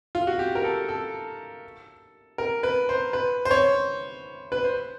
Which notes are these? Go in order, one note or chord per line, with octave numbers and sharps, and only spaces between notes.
F4
F#4
G4
A#4
A4
A4
A#4
B4
C5
B4
C5
C#5
B4
C5